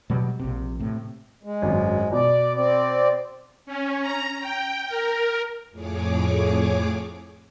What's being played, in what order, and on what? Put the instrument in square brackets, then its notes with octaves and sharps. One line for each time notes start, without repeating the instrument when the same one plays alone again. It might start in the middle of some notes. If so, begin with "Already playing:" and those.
[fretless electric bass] B2 F#3 G3
A#1 C3
A2 C3
[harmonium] G#3
[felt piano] G#1 F#2
[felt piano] B2 [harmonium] D5
[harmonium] C4 D5
[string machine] C#4
A#5
G5
A#4
F2 A2 G#4 C#5 D6